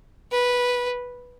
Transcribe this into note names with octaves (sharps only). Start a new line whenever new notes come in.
B4